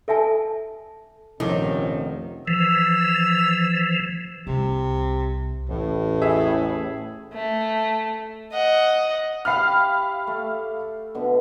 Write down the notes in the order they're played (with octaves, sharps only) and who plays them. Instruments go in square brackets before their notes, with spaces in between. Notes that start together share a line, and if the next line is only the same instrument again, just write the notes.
[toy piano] A4 E5 G#5 A5
[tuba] F1 [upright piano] A#1 D6 G7 [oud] D#3 [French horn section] C#4 C#5
[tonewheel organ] E3 F3 [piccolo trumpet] E6
[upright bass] C2 [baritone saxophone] C3
[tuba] A1 [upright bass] E2 [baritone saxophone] A2
[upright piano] G#4 E5
[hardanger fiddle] A3
D#5 F#5
[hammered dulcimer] E4 G4 [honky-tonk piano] F5 B5 F6
[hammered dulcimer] A3
B2 D3